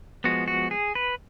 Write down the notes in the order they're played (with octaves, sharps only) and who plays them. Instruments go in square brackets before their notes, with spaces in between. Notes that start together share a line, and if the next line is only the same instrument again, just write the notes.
[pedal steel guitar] F3 G#3 B3 F#4
F#4
G#4
B4